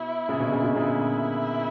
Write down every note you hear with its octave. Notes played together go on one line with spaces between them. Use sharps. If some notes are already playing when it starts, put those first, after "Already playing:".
Already playing: B2 E4
A#2 C#3
B2 D3
A#2 C#3
B2 D3
A#2 C#3 E4